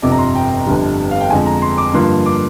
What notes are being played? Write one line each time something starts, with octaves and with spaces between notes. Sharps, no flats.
G1 F2 C3 D6
A#5
C6
G5
G1 F2 D3 G3
F5
G5
F2 D3 G#3 G#5
A#5
C6
D6
G2 D3 F3 A#3 C6
D6